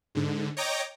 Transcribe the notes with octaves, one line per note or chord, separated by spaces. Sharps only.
G#2 D3
C#5 D#5 G5 A#5 D6